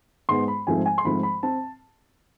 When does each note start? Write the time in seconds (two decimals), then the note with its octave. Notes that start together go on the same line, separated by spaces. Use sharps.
0.29 G#2 G#3 B3 C6
0.48 B5
0.67 G#2 F3 A3 C4 G#5
0.86 G#5
0.98 C6
1.05 G#2 F3 A3 C4 B5
1.23 B5
1.43 C4 A5